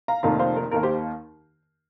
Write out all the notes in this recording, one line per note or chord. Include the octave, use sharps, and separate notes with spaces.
F5 A#5
F1 F2 D#3 A#3 F5 A#5
C5 F5
A#4
D#2 D#3 A#3 A#4
G4 C5